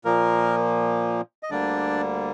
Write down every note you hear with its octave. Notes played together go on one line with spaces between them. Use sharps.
A#2 F3 A#3 A#4
D#5
D2 D3 G3 A#3 D4 D5